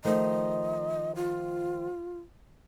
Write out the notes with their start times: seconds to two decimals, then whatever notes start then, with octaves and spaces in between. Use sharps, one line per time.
0.05 D#3 F3 A3 D#5
1.16 F4